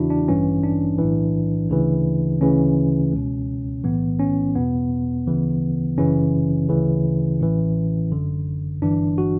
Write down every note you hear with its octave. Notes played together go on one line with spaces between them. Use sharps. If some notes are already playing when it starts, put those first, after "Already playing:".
Already playing: E2 C#3 E3 D4 E4 F#4
D4
A1 G2 E3 C#4
D4
B1 A2 E3
D2 C#3 E3
D2 C#3 E3 C#4
C#2 B2
B1 A2 E3 B3
C#4
E2 B2 B3
D2 C#3 E3
G1 F#2 C#3 E3 C#4
D2 C#3 E3
A1 A2 E3
G1 F#2 D3
G1 G2 E3 D4
F#4